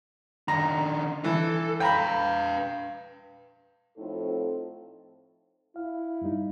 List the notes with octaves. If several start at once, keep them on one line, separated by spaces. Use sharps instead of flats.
D#3 D4 A#5
E3 A4
B4 F5 G5 A#5 B5
A2 F3 C4 D#4 F4 A4
E4 F5
G2 G3 D#4